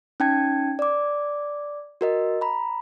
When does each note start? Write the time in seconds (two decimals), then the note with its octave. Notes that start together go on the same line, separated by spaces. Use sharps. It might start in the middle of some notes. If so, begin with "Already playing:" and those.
0.20 C#4 D#4 G5 A5 G#6
0.79 D5 D6
2.01 F#4 A#4 D#5
2.41 A#5 B5